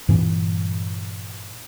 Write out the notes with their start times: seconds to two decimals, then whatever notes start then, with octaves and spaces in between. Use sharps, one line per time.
0.09 G2 A#2 E3 C4